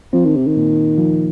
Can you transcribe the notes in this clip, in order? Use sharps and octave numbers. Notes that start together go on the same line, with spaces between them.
F3 C4
D#3
C3
D#3
A#2
F3